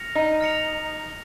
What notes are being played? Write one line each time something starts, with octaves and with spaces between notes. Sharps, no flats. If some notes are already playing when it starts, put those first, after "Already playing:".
Already playing: F6 A#6 C#7 F7
D#4
F6 A#6 C#7 F7